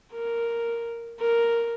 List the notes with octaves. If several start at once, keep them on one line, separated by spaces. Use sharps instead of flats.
A#4
A#4